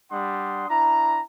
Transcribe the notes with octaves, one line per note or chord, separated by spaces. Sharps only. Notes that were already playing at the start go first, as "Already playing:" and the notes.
G3 D4 F#5 C6 D#6
D4 E4 A#5